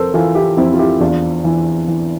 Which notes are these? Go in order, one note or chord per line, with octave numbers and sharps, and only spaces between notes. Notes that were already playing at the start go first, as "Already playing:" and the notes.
Already playing: F2 A4 A#4 C5
E3 F4 A4
E4 G4
F2 C4 E4
F4
E4 G4
E2 D4 F4
E3
E3